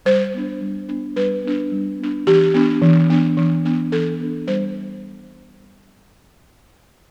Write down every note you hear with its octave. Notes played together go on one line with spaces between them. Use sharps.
G3 C5
B3 D4
G3
B3 D4
G3 B4
B3 D4
G3
B3 D4
E3 G4
B3 D4
E3
B3 D4
E3
B3 D4
E3 A4
B3 D4
G3 C5